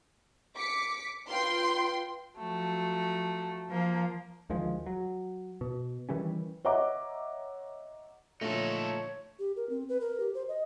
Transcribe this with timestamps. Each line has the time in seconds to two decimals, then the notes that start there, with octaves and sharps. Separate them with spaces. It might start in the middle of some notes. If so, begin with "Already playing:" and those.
0.57 D6 B6 C#7
1.29 F4 B4 G5 C6
2.39 F3 F#3 A3
3.69 F3 A#3
4.50 D2 D#3 F3 G#3
4.86 F#3
5.61 B2
6.09 D#3 E3 G3 C#4
6.65 C#5 D#5 E5 F#5 A#5 D6
8.41 A#2 D3 F3 A3 D#4 A4 C#5
9.39 G4
9.56 A#4
9.70 C4
9.89 B4
10.01 A#4
10.20 G4
10.34 C5
10.48 D#5